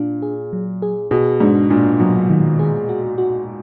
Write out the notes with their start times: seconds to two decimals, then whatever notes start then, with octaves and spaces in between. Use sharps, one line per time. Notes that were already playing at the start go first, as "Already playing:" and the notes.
Already playing: A#2 D4
0.22 G#4
0.53 F#3
0.82 G#4
1.11 B2 G#4
1.40 G#2 D4
1.70 A#2 D4
2.00 B2 F#3
2.29 D#3
2.59 G#4
2.89 F#4
3.18 F#4